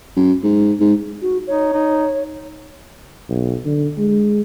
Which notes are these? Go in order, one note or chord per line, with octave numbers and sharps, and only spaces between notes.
F#2
G#2
G#2
F#4
D#4 C#5
D#4
B1
D3
G#3